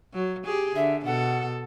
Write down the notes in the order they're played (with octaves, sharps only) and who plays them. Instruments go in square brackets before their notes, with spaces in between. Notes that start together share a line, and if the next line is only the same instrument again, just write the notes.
[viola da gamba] F#3
G4 G#4
[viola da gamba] D3 [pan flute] E5
[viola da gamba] B2 A4 [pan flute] F#5